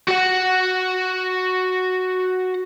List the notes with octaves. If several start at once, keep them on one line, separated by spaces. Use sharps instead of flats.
F#4 F#5